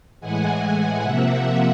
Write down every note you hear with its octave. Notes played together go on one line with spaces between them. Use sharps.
A2 E3 G#3 F#5 G#5
C3 F3 A#3 E5 F#5
E5 F#5